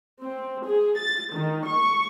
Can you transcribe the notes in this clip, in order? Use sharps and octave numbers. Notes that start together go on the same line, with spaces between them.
C4
G#4
A6
D#3
C#6